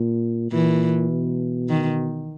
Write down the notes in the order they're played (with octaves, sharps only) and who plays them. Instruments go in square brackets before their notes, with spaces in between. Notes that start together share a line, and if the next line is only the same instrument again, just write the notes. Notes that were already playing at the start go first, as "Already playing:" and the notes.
Already playing: [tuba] A#2
[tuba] A#2 [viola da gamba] E3
[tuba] B2
[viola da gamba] D#3